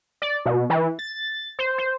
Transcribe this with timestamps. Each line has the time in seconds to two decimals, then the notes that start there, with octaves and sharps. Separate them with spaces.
0.22 D5
0.46 B2
0.70 E3
0.99 A6
1.59 C5
1.78 C5